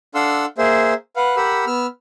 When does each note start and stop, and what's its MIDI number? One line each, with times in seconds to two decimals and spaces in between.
0.15 0.46 62
0.15 0.46 69
0.15 0.46 77
0.15 0.46 78
0.15 0.46 84
0.15 0.46 88
0.58 0.93 58
0.58 0.93 68
0.58 0.93 72
0.58 0.93 76
1.16 1.36 71
1.16 1.36 77
1.16 1.36 78
1.36 1.65 67
1.36 1.65 70
1.36 1.65 78
1.36 1.65 83
1.36 1.65 88
1.67 1.87 59
1.67 1.87 88
1.67 1.87 89